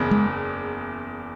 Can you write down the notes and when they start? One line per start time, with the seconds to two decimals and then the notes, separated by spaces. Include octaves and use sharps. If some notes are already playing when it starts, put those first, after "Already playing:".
Already playing: F#1 E2 C#3
0.11 G#3